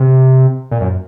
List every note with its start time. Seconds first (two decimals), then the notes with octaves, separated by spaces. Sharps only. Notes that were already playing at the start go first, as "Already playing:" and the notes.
Already playing: C3
0.71 A#2
0.81 F#2